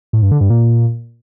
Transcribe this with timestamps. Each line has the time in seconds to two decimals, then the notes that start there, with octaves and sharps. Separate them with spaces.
0.13 A2
0.22 G2
0.31 D3
0.41 G2
0.50 A#2